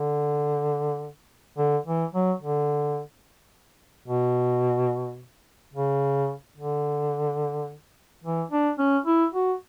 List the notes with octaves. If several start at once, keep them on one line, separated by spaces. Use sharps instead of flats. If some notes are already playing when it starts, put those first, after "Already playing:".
Already playing: D3
D3
E3
F#3
D3
B2
C#3
D3
E3
D4
C#4
E4
F#4